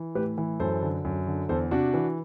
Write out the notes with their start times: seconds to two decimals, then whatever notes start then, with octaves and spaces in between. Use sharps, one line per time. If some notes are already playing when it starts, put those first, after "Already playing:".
Already playing: E3
0.15 A2 G4 B4
0.38 E3
0.60 F#2 A4 C5
0.82 D3
1.05 F#2
1.27 D3
1.49 E2 A4 C5
1.71 C3 D4 F#4
1.94 E3